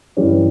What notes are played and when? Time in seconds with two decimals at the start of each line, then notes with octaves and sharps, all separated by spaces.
0.17 G2 E3 G3 C#4